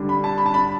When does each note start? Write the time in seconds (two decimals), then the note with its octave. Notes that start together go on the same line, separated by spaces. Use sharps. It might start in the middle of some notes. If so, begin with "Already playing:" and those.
Already playing: D3 G3 D4
0.09 B5
0.24 A5
0.38 B5
0.46 A5
0.54 B5